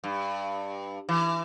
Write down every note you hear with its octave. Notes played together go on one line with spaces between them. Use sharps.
G2
E3